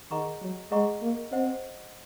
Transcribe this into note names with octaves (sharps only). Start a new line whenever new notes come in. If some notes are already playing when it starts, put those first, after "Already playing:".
D#3 G#4 D#5 F#5 A#5 C#6
F#3
G#3 G#4 D#5 F#5 A#5 C#6
A#3
C4 C5 D#5 F#5